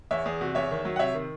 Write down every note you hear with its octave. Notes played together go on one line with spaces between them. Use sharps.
E2 C#5 E5
E2 G#4
C3 F#4
E2 C#5 E5
D#3
F#3
F#5
C3 C#5 E5
D#3